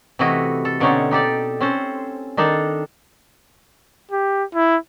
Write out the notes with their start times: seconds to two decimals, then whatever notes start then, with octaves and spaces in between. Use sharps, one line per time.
0.19 C3 E3 A3 E4 F#4 D#5
0.65 A4
0.80 B2 D3 C4 C#4 D#4 C#5
1.11 D#4 G4 A4 D5
1.60 C4 C#4 A4 C5
2.37 D#3 D4 D#4 A4
4.11 G4
4.55 E4